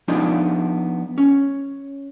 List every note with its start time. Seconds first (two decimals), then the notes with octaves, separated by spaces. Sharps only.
0.08 F3 G#3 B3 D4 D#4 F4
1.18 C#4